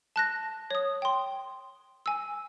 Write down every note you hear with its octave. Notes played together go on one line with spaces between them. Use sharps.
A5 F#6 A#6
C#5 D#6
G5 C6
G#5 E6